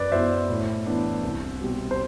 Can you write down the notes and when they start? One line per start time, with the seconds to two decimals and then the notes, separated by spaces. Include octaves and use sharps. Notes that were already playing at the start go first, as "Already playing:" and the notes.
Already playing: F#2 B4 D5
0.11 F#3 B3 E4 C5 E5
0.49 A2
0.86 E3 B3 D4
1.23 C2
1.61 B2 G3
1.91 C5